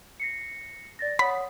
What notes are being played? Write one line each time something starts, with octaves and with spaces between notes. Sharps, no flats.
A#6 C7 C#7
D5 A6 A#6
C#5 F#5 B5 D#6